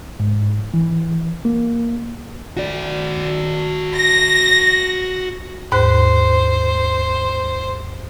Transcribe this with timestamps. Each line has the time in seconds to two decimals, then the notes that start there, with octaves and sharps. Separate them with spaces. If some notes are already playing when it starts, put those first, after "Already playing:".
0.20 G#2
0.74 E3
1.45 A#3
2.57 F#4 D5
3.96 A#6
5.72 D#2 G#2 C5 F#6